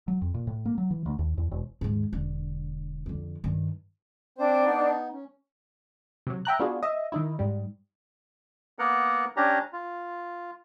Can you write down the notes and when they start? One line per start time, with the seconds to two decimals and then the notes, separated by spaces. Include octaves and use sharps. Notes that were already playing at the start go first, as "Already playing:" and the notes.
0.08 F#3
0.22 F2
0.34 A#2
0.47 A2
0.65 A#3
0.78 F#3
0.91 E3
1.06 D2
1.19 D#2
1.38 E2
1.51 E1
1.81 D#2 G#2
2.13 E1 D3
3.06 F2 D3
3.44 G2 D#3
4.38 C4 D4 C5
4.65 B3 D#4
5.12 C#4
6.27 C3 F#3
6.45 E5 G5 A#5 F#6
6.59 B3 D4 F4 F#4 G#4
6.83 D#5 E5
7.12 D#3 D#4 E4
7.39 G#2 G3
8.79 A#3 B3 A#4 F#5
9.37 C#4 D4 G4 A#5
9.73 F4